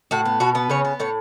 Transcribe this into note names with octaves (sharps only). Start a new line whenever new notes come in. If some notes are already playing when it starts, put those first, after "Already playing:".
A2 F#4
B3
B2 F#4
B3
C#3 C#5
B3
A2 C#5